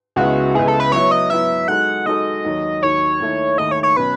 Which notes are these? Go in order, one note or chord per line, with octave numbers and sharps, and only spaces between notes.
C#2 C#3 G#3 B3 E4 F#4
C#2 C#3 G#3 B3 E4 G#4
A4
B4
F#3 B3 E4 C#5
D#5
F#3 B3 E4 E5
G#3 D#4 F#4 A4 F#5
G#3 D#4 F#4 A4 D#5
D#2 D#3 F#3
D#2 D#3 F#3 C#5
D#2 D#3 A3 E4
D#2 D#3 A3 E4 D#5
C#5
C#5
B2 F#3 C#4 B4